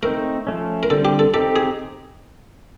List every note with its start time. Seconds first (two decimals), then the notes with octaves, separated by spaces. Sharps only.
0.03 A3 C4 D#4 A#4
0.47 F3 A3 C#4
0.83 A#4
0.90 D3 G3 C4 A4
1.05 G4
1.19 A4
1.34 C4 D#4 G4 A4
1.56 G#4